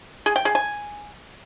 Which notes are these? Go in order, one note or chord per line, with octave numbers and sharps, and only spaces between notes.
G#4
G5
G#4
G#5